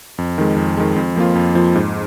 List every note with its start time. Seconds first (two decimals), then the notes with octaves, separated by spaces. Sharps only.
0.18 F2
0.38 D#3 G#3
0.56 F2
0.77 D#3 G#3
0.96 F2
1.16 F3 A#3 F4
1.35 F2
1.55 F3 A#3 F4
1.75 G#2